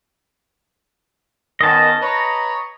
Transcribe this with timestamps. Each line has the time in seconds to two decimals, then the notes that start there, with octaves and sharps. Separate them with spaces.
1.61 D#3 B3 C#4 D#5 A5
2.01 B4 C#5 A#5